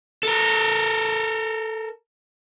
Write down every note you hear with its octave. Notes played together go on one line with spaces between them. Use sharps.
A4 A#4